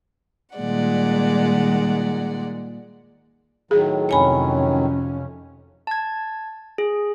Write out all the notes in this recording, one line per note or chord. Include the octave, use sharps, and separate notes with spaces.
A#2 D#3 G3 G#3 D5 F#5
A2 D#3 F#3 G#4
F2 C3 C#4 C#5 G#5 B5
A5 G#6
G#4